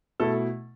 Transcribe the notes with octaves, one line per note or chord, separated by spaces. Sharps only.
B2 A3 E4 A4